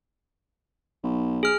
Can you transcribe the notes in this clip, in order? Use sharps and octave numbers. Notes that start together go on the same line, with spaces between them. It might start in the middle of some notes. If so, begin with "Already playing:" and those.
B1
G#4 F6